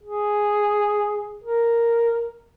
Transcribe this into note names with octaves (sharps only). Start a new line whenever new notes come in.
G#4
A#4